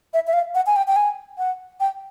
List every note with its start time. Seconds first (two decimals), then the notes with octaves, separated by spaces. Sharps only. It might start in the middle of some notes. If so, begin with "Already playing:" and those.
0.14 E5
0.27 E5
0.33 F5
0.55 F#5
0.66 G#5
0.76 G5
0.88 G5
0.96 G#5
1.38 F#5
1.80 G5